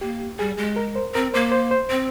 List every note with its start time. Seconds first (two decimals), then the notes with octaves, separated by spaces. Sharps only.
0.01 A#3 G4
0.39 G3 G#4
0.58 G#3
0.76 A#4
0.96 C5
1.14 C4 A#4
1.34 A#3 C5
1.52 C5
1.71 C5
1.90 C4